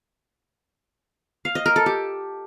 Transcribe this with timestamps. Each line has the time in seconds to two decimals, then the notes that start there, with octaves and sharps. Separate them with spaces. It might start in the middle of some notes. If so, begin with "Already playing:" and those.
1.45 F5
1.55 D#5
1.66 A#4
1.76 A4
1.86 G4